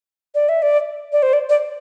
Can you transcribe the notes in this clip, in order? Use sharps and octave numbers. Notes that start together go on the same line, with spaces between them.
D5
E5
D5
D5
C5
D5
D5